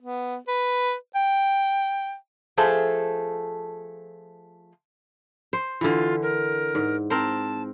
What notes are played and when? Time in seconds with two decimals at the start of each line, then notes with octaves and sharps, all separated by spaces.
0.02 B3
0.48 B4
1.15 G5
2.57 F3 A3 G#4 A4 C5 A5
5.53 C5
5.81 D3 E3 F4
6.22 A#4
6.75 G#2
7.10 C4 A#4 C5 A5